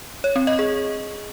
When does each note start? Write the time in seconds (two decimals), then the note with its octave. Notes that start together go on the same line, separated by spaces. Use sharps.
0.24 C#5
0.36 C4
0.47 D#5
0.59 G#4